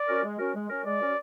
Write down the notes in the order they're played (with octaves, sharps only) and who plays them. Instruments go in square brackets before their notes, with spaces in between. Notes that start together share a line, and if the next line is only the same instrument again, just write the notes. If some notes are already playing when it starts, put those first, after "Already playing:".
Already playing: [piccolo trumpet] D5
[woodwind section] C#4 F#4 A#4
G#3
C#4 F#4 A#4
G#3
C#4 F#4 A#4
[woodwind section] G#3 [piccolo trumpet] D5
[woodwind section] C#4 F#4 A#4